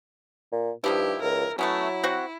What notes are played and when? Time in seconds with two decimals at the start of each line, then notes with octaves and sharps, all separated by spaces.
0.52 A#2
0.84 G2 D#3 F3 E4 G4
1.22 C#2 A#4
1.59 F#3 A3 B3 C#4 E4
2.04 C4 F#4 F#5